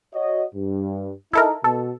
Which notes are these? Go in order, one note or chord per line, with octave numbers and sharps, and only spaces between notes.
F#4 C#5 D#5
G2
D#4 E4 A4 A#4
B2 A4